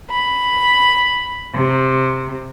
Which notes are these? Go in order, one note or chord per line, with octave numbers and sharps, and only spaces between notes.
B5
C3